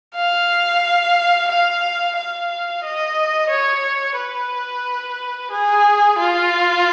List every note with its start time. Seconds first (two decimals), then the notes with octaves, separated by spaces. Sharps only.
0.15 F5
1.49 F5
2.16 F5
2.84 D#5
3.50 C#5
4.18 B4
5.51 G#4
6.18 F4